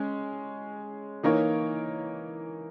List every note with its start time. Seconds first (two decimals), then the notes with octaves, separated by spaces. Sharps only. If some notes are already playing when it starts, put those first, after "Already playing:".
Already playing: G#3 C#4
1.23 E3 A#3 D#4 A#4 C#5